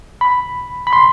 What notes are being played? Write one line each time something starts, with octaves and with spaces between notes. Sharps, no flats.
B5
B5
C6